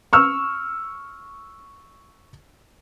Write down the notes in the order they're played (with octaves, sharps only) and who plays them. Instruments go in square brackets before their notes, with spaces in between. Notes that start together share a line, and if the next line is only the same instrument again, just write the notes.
[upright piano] C#6 E6 F6